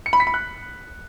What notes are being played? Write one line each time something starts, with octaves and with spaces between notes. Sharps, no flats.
C#7
B5
B6
B5
F#6